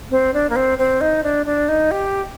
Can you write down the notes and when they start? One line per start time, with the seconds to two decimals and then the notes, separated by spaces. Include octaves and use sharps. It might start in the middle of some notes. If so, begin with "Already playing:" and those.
0.11 C4
0.34 D4
0.50 A#3
0.56 C4
0.78 C4
1.01 D#4
1.23 D4
1.46 D4
1.68 D#4
1.91 G4